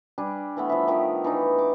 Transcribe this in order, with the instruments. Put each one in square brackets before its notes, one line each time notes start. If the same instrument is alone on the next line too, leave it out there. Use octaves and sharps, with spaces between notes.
[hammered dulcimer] G3 D4 G#5
E3 A3 B3
F3 E5
D#3 F3 G4
E3 D4 D#4
D6